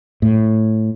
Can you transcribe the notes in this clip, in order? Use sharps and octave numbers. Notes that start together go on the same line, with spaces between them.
A2